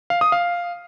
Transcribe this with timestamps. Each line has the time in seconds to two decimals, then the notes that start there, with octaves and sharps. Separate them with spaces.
0.10 F5
0.21 D#6
0.32 F5